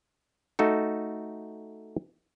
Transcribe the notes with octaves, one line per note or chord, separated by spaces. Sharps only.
A3 D#4 F#4 A4